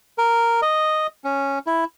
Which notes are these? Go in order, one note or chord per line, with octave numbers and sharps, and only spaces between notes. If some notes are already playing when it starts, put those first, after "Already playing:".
A#4
D#5
C#4
E4